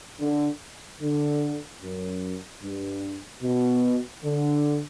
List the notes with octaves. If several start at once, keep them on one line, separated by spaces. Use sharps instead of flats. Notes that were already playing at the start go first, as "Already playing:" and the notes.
D3
D3
F#2
G2
B2
D3